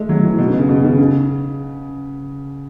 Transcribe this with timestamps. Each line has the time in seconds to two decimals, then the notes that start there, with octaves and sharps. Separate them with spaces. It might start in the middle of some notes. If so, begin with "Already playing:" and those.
Already playing: G#3 A3
0.09 F#3
0.23 E3
0.38 B2
0.48 C#3
0.59 C#3
0.69 B2
0.84 C#3
0.98 C#3